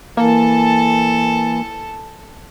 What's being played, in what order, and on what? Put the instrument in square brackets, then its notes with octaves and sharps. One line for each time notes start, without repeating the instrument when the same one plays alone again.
[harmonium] E3 [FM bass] A#3 [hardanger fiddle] A4 A5